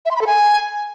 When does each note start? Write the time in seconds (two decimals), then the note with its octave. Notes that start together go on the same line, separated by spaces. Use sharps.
0.06 E5
0.11 C6
0.16 B5
0.21 A4
0.27 G#5